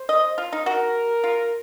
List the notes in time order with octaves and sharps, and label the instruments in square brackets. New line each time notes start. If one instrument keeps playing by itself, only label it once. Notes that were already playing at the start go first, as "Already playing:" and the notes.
Already playing: [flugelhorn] C5
[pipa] D#5
F4
D#4
[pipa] F#4 [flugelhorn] A#4
[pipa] F4